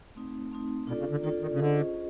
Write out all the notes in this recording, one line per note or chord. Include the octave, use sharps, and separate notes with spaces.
A3 C4 D#4
A3 C4 D#4
B2 D4 F4 A4 D5
C#3
D3
D#3 D4 F4 A4 D5
D#3
C#3
D3 C#4 F4 G#4 C5 D#5